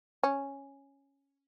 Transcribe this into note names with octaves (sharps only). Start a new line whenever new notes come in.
C#4